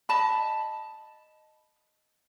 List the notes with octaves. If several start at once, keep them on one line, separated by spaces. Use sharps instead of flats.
D#5 A5 B5